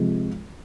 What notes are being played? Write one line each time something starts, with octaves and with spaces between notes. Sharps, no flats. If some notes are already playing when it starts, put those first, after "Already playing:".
Already playing: C3 F3 G#3